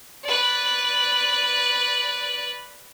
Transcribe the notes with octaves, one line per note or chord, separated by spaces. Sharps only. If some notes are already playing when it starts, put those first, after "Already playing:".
B4 D5